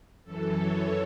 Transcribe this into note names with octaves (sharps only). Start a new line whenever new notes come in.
F#2 E3 A4
C#5